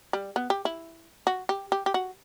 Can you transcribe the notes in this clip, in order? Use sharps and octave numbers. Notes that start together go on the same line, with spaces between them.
G3
B3
G4
E4
F#4
G4
G4
G4
F#4